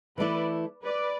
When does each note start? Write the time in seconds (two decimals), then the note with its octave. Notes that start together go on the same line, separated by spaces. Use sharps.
0.18 E3 A3 E4 B4 D5
0.84 B4 D5